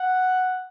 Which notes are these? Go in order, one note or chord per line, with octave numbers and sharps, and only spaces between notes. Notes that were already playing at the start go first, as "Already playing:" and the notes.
Already playing: F#5